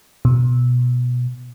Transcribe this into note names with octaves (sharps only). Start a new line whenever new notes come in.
B2